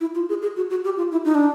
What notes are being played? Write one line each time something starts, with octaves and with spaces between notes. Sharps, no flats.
E4
F4
G#4
G#4
F#4
F#4
G4
F4
E4
D#4
D4